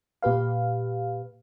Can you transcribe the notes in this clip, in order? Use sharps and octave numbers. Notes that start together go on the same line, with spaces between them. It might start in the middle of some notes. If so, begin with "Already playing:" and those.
A#2 G4 B4 F5